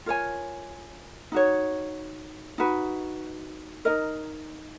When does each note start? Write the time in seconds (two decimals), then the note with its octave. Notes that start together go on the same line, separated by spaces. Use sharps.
0.06 F4 A#4 C#5 G#5
1.32 D#4 F#4 C#5
2.58 D#4 F#4 B4
3.85 D#4 A#4 D#5